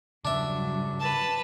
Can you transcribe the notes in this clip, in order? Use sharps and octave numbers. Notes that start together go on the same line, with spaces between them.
G2 C#3 F#3 G3 D4 E5
B4 A5